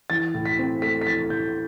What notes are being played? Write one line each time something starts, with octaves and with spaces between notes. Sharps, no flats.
E3 A6
A2
B6
C4
A3 B6
B6
E3 A6
A2 G6